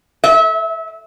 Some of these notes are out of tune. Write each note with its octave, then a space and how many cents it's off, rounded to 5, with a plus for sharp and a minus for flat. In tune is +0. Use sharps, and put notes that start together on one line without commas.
E5 -30